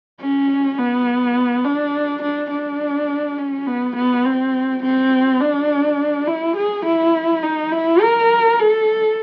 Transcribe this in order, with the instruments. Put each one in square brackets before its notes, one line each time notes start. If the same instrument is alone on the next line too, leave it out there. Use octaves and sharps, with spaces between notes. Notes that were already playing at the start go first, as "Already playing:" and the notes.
[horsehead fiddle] C#4
B3
D4
D4
D4
C#4
B3
B3
C4
C4
D4
E4
G#4
E4
D#4
E4
A#4
A4